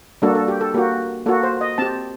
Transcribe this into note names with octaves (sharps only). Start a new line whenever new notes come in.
G3 A#3 D4 F#4 A4
A4
G4
A4
A#3 F#4 G4
A#3 F#4 A4
C5
D#5
C4 G4 A5